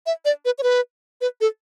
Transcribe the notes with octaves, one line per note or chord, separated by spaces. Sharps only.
E5
D5
B4
C#5
B4
B4
A4